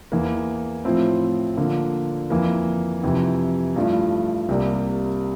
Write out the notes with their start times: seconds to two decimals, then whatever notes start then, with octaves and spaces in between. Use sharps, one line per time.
0.12 E2 E3 A#3
0.85 A2 F3 C4 E4
1.57 D3 F3 A#3
2.30 F2 E3 A#3
3.03 F2 C3 E3
3.76 G2 F3 A3 E4
4.49 C2 C3 G3 A#3